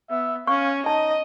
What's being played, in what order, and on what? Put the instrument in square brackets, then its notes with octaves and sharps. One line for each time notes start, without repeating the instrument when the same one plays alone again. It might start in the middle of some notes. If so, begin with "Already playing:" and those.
[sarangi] B3 [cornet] E5
[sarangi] C#4 [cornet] F5 [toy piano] C#6
[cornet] D#4 [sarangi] D#5 [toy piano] A5